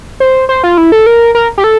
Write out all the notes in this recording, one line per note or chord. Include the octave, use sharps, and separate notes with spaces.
C5
C5
F4
E4
A4
A#4
A#4
G4
A4